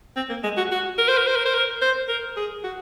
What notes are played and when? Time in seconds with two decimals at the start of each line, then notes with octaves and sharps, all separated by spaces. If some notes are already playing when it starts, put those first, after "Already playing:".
0.16 C4
0.30 A#3
0.44 G#3
0.57 F#4
0.72 F#4
0.98 A#4
1.09 C5
1.18 A#4
1.27 C5
1.36 A#4
1.46 C5
1.55 A#4
1.82 C5
2.08 A#4
2.37 G#4
2.64 F#4